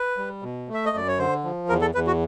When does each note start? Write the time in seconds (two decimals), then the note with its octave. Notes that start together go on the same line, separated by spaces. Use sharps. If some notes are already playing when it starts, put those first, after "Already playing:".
Already playing: B4
0.18 G3
0.42 B2
0.68 A3
0.74 E5
0.86 D#5
0.93 F#2 D5
1.08 C#5
1.18 D3 C5
1.44 F3
1.69 E2 A#4
1.81 A4
1.95 E2 B4
2.07 F#4